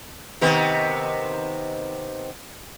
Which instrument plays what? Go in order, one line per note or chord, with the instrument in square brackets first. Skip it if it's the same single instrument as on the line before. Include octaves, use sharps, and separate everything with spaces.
[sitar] C3 D#3 B3